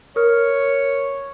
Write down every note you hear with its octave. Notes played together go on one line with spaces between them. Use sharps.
A#4 C#5 F6